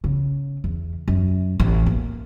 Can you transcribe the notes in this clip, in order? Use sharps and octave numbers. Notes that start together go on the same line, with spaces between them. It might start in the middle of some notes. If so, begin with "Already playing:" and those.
C#3
E2
F#2
A1
A#3